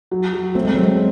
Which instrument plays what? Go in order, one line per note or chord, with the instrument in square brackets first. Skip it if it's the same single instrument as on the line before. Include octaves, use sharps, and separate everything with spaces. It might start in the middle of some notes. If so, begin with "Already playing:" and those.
[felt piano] F#3
F#3
[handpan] A3 [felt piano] C4
[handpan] G#3
[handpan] F#3 [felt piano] C4
[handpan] G#3